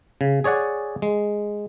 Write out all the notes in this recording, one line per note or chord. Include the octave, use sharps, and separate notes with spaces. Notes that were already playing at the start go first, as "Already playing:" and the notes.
C#3
G#4 C#5 D5 F#5 G#5
G#3